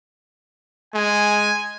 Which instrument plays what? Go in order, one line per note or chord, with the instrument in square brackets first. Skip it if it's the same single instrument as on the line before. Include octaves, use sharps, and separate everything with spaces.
[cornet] G#3 [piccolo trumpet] G#5